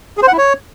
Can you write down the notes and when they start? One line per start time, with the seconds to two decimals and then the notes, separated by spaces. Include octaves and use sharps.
0.17 G#4
0.23 C5
0.28 F#5
0.33 E4
0.38 C#5